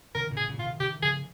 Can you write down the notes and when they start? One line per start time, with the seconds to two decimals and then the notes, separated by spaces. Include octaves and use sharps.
0.15 C3 D#3 A#4
0.31 A#2 C#3
0.37 G#4
0.48 A#2 C#3
0.59 F4
0.64 C3 D#3
0.80 C3 D#3 G4
1.02 C#3 F3 G#4